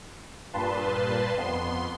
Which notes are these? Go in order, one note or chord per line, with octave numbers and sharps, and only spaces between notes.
G2 A#2 B4 A5 C6
F2 B3 C6